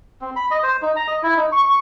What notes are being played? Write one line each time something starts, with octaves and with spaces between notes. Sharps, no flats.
C4
B5
D#5
C5
D#4
A#5
D#5
E4
D#4
C#6
C#6